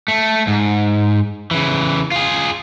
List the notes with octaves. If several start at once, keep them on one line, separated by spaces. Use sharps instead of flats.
A3
G#2
C#3 E3
F4 G#4